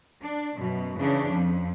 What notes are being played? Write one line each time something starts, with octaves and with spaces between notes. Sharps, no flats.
D4
F#2 B2
C#3 E3 C#4 D4
F2 F3